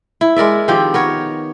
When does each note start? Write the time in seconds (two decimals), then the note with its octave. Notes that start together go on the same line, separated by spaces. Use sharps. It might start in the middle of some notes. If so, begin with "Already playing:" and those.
0.21 E4
0.36 G#3 A#4 D5 E5
0.68 D#3 F3 C4 G4
0.94 B3 A#4 C#5